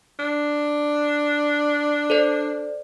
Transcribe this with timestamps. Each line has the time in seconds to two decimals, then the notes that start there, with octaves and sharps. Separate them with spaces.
0.19 D4
2.10 A4 C5 D5